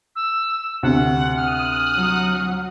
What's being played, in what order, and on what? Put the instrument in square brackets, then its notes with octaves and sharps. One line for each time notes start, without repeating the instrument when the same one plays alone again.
[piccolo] E6
[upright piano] D2 C3 [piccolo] F#5
[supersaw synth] D#6 F#6 [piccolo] F6
[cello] F#3